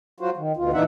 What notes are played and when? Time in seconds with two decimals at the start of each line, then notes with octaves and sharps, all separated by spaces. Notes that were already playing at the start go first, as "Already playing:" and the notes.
0.20 F#3 F4 F#4 C5
0.37 D#3
0.57 D2 B2 F4
0.73 A#2 E3 D4 D#4 E5 F#5